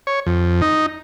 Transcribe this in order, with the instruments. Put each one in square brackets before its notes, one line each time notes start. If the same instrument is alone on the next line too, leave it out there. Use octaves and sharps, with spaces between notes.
[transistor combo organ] C#5
F2
D#4